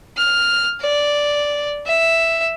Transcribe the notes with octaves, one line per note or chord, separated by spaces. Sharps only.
F6
D5
E5